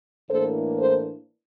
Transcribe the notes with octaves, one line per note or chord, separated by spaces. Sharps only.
A2 E3 A#3 D4 A4 C5
A4 C5